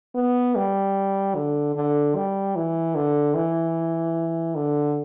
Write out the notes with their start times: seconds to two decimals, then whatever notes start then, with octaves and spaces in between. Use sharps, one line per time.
0.15 B3
0.55 G3
1.35 D3
1.75 D3
2.16 G3
2.56 E3
2.95 D3
3.35 E3
4.55 D3